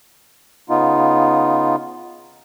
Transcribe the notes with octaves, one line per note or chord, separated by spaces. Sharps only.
C#3 B3 D#4 F4